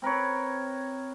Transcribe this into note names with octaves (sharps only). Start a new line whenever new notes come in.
C4 A#4 B4 C#5